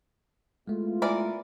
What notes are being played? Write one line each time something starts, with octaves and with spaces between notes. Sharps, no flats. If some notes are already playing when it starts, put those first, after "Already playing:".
G#3 A3 B3 E4 F4
E3 A#4 D5